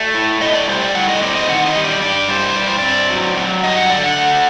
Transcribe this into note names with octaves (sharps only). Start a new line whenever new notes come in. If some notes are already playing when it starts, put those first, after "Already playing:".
Already playing: A3 D5
A2
A2 D#5
D5
G3 C5
D5
A2 F#5
D#5
C4 D5
D#5
D#3 F#5
D#5
G3
D5
G2 D5
G3 C5
G2 D5
C5
C4 D5
F#3
F#3
G2 D#5
F#5
D3 D5
F#5
A3